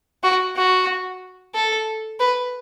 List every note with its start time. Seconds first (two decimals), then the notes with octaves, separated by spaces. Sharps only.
0.23 F#4
0.56 F#4
1.54 A4
2.20 B4